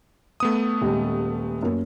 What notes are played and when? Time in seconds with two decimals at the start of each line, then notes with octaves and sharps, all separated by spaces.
0.40 A3 B3 D#6
0.81 D#1 G#3 G4
1.63 F#2 A#3